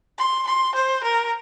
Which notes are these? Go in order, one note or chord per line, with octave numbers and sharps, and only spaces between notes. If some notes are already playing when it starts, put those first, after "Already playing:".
C6
C6
C5
A#4